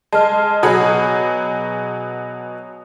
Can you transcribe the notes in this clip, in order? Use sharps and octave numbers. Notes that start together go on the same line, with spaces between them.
G#3 A5 F6
A5
B2 F#3 G#4 B5